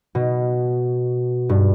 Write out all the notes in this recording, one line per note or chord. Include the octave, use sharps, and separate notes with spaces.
B2
G2